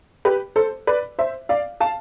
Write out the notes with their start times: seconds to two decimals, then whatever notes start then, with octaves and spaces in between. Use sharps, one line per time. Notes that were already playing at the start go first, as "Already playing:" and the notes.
0.25 G4 B4
0.56 A4 C5
0.87 B4 D5
1.19 C5 E5
1.49 D5 F5
1.80 F5 A5